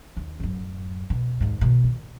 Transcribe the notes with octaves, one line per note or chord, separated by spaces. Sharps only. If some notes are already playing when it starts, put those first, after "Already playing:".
D#2
D1 F#2
B2
D#2 G#2
B2 D#3
D#3